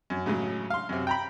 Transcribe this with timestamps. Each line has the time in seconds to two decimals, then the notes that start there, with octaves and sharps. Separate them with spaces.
0.10 F#2
0.26 A2 C#3 F#3 G#3
0.70 F5 C6
0.89 F#2 C3
1.07 G5 A#5 B5